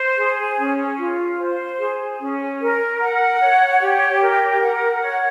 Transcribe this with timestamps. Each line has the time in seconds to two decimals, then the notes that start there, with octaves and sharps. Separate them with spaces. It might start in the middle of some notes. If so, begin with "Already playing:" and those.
Already playing: C5
0.18 G#4
0.59 C#4
0.98 F4
1.39 C5
1.79 G#4
2.20 C#4
2.60 A#4
3.01 F#5
3.40 C#5
3.81 G4
4.21 A#4
4.61 F#5
5.02 C#5